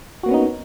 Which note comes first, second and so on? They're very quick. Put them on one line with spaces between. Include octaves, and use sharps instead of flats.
F#4 A#3 B3 C#4 D#4